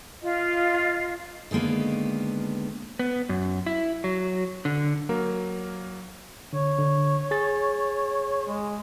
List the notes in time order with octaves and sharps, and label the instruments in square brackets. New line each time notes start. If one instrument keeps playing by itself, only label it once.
[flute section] F4 D#5
[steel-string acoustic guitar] D3 D#3 G#3 A#3 B3
[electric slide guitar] B3
F#2
E4
F#3
D3
[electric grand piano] F#3 A#3 A#4
[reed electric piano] D3 [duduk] C#5
[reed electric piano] D3
G#4 A6
[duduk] G#3